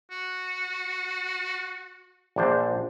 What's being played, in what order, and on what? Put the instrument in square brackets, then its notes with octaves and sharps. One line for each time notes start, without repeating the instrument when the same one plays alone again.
[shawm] F#4
[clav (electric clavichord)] A#1 D4 C5